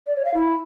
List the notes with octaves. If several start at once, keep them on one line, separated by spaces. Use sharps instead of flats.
D5
C#5
F5
E4